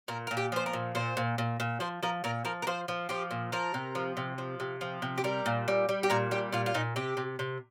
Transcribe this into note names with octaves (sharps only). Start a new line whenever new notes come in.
A#2 A#4
A#2 A#4
G4
F3 C5
A#4
A#2
A#2 C5
A#2
A#2
A#2
F3 C5
F3 A#4
A#2 A#4
F3 A#4
A#4
F3 C5
F3
F3 G4
A#2
F3 A#4
C3
F3
C3
F3
C3
F3
C3
G4
G3 A#4
A#2
G3
G3
G4
A#2 A#4
G3 G4
A#2 F4
F4
A#2 D#4
C3 G4
C3
C3